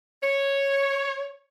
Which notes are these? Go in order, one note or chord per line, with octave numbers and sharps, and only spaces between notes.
C#5